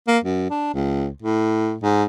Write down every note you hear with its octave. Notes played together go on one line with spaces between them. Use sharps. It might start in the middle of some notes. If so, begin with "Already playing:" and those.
A#3
F#2
D4
C#2
A2
G#2